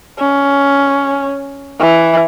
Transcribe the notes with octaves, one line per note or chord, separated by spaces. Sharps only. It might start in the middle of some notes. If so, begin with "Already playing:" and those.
C#4
E3